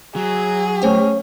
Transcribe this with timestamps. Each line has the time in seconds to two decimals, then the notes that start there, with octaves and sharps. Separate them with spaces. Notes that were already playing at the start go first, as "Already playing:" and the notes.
0.16 F#3 G#4
0.82 A3 C#4 C5 G5